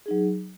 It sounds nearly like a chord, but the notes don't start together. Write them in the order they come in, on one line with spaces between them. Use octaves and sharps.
G#4 D#4 F#3